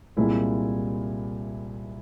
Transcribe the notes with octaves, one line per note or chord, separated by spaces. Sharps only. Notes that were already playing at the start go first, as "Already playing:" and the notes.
C2 A#2 G#3 E4